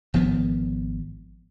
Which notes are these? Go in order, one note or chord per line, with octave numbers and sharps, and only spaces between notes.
G#1 F3 B3